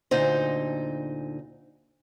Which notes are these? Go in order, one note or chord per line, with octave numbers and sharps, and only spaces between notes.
D2 A#2 D3 D#4 C5